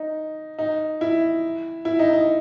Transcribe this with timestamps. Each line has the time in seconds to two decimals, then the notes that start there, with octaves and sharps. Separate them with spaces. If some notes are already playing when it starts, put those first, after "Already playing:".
Already playing: D#4
0.59 D#4
1.01 E4
1.85 E4
1.99 D#4
2.13 D#4